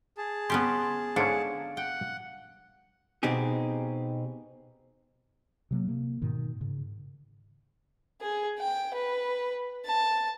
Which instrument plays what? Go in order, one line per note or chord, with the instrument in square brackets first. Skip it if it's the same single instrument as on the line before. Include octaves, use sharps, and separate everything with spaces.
[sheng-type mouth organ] G#4 A5
[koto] B3 C#4 G4 [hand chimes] C6
[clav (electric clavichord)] G#2 D3 C#4 [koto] D4 [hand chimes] F5 C#7 D7
[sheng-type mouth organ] F#5 [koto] G5
[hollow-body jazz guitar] B2 C4 D#4 G4 G#4
[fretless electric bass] C3 F#3 A#3
C3 A#3
G#2 B2 D#3
G#2 C#3
[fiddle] G#4
G5
B4
A5